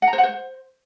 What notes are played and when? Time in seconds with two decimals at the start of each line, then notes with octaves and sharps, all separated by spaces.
0.02 F#5
0.08 A#5
0.13 C5
0.18 F#5
0.23 C5